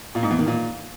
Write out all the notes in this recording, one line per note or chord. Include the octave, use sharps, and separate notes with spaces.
A#2
G#2
E2
D#3
A#2